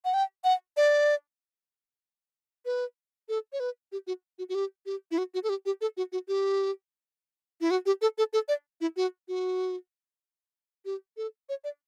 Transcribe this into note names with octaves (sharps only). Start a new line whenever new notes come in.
F#5
G5
F#5
D5
B4
A4
C#5
B4
G4
F#4
F#4
F#4
G4
G4
E4
F#4
F#4
A4
G4
G4
A4
F#4
F#4
G4
E4
F#4
G4
A4
A4
A4
D5
E4
F#4
F#4
G4
A4
C#5
D5